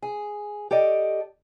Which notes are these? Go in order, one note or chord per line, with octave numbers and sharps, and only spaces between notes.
G#4
G4 A4 D5 D#5